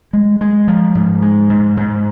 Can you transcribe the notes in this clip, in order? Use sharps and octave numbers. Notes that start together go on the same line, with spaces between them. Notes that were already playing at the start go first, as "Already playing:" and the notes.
G#3
G#3
F3
G#2
G#3
G#2
G#2